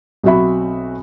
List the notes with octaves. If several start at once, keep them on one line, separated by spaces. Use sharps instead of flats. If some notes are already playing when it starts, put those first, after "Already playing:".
B1 F#3 C4 F#4 E5 B5